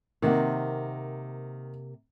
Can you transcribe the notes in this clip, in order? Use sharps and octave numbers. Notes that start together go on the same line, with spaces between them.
C3 D#3 A#3 F#5